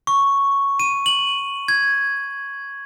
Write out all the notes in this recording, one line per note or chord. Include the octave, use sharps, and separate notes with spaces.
C#6
D#7
F#7
G#6